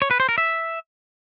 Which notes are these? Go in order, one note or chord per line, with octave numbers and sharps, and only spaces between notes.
C#5
B4
C5
A#4
E5